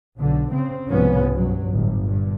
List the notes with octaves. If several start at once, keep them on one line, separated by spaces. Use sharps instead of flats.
B1 D3
C#3 C4
C2 G#2 F3 B3 C#4
B1 G2 F#3
G1 A2
G2 A#2